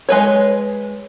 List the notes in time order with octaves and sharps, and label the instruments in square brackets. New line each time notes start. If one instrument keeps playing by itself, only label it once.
[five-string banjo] G#3 B4 C#5